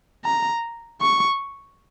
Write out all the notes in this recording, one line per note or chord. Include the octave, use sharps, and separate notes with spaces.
A#5
C#6